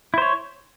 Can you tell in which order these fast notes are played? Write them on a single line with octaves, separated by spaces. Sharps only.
E4 C5 C#5